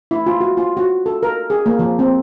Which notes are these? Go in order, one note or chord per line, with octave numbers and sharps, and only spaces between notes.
E4
F4
F#4
F4
F#4
A4
A#4
G#4
A#3
F3
C4